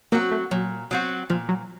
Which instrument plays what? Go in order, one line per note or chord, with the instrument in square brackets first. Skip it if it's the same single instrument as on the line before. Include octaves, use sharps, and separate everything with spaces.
[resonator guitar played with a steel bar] F#3 C4 F#4 [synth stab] A#3
[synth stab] A3
[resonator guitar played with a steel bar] A#2 [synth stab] F#3
[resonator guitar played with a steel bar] F#3 C4 F#4
[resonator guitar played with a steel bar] A#2 [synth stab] F3
[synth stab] F#3